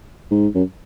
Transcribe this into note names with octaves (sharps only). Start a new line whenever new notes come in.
G#2
F#2